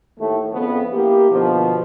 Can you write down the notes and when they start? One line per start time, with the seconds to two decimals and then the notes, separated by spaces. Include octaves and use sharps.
0.19 D#2 A2 A3
0.52 F2 C#3 B3
0.94 A#3 E4 G4
1.31 B2 D3 F3